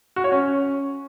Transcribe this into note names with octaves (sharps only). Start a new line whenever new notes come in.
F#4
C#5
C#4